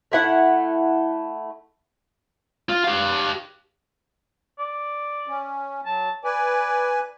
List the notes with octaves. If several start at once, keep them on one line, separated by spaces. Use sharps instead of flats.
A3 E4 F#5
F4
G4 F5
D5
C#4
F#3 A5
B4 D5 G#5